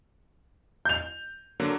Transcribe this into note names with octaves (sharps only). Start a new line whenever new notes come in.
G6 F7
D3 F#3 A#3